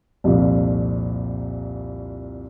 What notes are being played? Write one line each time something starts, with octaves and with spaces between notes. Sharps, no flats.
C2 F2 A#2